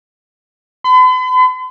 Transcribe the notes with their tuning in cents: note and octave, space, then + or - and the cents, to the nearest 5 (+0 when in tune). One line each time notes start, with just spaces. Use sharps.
B5 +45